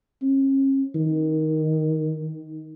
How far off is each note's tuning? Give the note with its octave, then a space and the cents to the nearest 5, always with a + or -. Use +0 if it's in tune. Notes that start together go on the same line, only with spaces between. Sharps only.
C#4 -40
D#3 +10